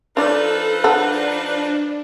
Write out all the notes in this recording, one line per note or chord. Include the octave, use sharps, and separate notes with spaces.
F3 D4 D#4 A4 B4 D5
D3 D4 A4 F#5